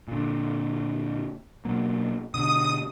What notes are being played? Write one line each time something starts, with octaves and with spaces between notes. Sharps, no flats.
A#2 D3
B2 F#3 A#3
B2 D3 D#6